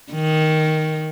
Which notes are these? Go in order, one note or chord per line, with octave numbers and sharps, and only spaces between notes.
D#3